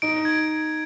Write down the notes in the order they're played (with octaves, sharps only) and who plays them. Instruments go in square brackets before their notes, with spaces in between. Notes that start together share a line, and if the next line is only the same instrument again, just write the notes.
[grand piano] D#4 [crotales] D7
[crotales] G#6
D7